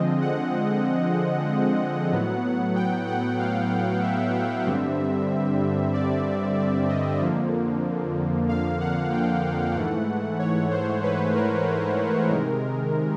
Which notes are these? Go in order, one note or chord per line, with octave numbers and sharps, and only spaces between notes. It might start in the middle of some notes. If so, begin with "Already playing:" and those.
Already playing: D3 F3 G#3 C4 D#5
F#5
A2 F#3 B3
G5
F#5
F5
E5
G2 D3 G3 C4
D5
D5
D#5
F2 D3 F3 A#3
F5
F#5
G5
G#2 E3 A3 F#5
C#5
C5
B4
A#4
B4
B4
C3 D#3 G#3 A#4